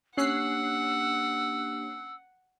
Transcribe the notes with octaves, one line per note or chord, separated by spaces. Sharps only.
A#3 C#4 D4 G4 F#5 E6 F#6 C7